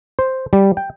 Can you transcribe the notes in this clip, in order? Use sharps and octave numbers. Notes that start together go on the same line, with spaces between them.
C5
G3
G5